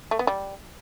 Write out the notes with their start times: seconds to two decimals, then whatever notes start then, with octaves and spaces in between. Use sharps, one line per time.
0.11 A3
0.19 B3
0.27 G3